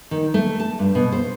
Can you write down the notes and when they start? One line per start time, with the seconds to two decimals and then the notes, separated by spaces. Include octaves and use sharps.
0.11 D#3
0.34 A3
0.60 A5
0.79 G2
0.95 B2
1.12 C5